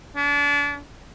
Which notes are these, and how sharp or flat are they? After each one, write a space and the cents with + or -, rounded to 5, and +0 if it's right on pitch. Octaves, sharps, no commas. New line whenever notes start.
D4 -35